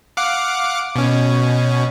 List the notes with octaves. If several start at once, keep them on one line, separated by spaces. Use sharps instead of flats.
F5 F#5 D6
B2 C#4